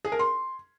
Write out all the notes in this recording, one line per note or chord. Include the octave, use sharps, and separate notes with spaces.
G#4
A#4
C6